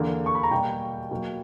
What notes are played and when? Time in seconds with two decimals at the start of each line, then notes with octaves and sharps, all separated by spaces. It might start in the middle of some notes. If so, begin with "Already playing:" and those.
Already playing: E2 D3 A#3
0.26 C#6
0.35 B5
0.43 A#5
0.51 B2 G3 A#3 G5
1.11 B2 F#3 A#3